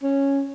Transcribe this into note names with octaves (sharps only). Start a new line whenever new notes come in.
C#4